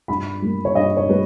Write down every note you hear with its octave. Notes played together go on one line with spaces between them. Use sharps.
G2 B5
G3 A#3
C#5
G2 D#5
C#5
G3 A#3 B4